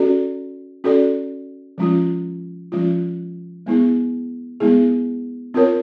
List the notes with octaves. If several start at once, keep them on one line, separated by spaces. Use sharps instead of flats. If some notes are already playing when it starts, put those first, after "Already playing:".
Already playing: C#4 F#4 A4 D5
C#4 F#4 A4 D5
F3 G#3 C#4 F4
F3 G#3 C#4 F4
G#3 B3 E4 G#4
G#3 B3 E4 G#4
C4 F4 A#4 C#5